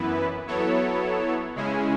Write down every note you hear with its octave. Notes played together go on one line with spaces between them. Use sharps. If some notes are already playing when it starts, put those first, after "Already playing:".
Already playing: F#2 E3 B3 E4 B4
F#3 B3 E4 A4 C#5
C#3 G#3 C#4 E4 G#4